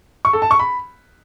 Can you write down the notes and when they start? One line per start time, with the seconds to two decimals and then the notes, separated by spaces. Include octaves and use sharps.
0.25 C#6
0.33 A4
0.42 A5
0.51 C#6
0.59 B5